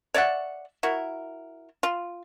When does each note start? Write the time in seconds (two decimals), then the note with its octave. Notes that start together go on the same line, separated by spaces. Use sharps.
0.14 C#5 D5 E5 F#5
0.83 E4 F#4 A#4
1.83 F4